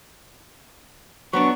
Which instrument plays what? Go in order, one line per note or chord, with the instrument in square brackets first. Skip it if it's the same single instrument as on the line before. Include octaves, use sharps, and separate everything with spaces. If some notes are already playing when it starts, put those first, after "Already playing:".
[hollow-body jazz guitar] F#3 B3 D4 [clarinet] C#6